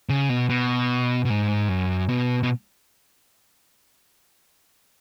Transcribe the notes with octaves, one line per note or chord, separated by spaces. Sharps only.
C#3
B2
B2
B2
G#2
F#2
B2
B2